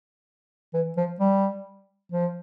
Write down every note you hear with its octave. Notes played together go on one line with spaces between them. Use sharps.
E3
F3
G3
F3